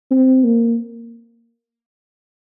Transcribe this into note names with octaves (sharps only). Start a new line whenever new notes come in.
C4
A#3